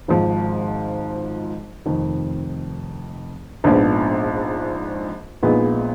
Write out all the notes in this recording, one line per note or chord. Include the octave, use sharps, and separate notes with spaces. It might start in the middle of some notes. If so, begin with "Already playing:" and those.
G#1 G#2 F3
F1 F2 D#3
A#1 G#2 F3 B3 D4
A#1 A#2 G#3 B3 D#4